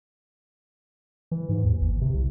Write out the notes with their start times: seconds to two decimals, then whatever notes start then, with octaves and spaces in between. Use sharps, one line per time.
1.31 E3
1.49 G#2
1.64 D#2
1.81 G1
2.01 C3
2.14 C2